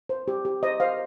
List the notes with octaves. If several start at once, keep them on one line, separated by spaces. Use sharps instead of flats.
C5
G4
G4
C5 D#5
C5 F5